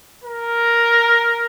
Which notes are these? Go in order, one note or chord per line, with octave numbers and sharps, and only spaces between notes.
A#4